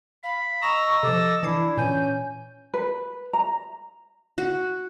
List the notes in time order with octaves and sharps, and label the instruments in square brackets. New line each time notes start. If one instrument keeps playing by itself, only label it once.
[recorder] F5 [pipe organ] B5
[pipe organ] D#5 E6 A#6 [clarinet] A#5 [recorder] C#6
[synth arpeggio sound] C3 F3 [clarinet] A4 [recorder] D6
[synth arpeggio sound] E3 G#6 C7 [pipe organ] D4 [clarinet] E4
[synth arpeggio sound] A#2 E3 [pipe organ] C#4 [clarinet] G#5 [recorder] G6
[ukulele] B4
A#5
[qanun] F#4